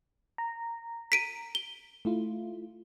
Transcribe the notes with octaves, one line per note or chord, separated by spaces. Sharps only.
A#5
B6 D7 D#7
G7
A3 E4 F4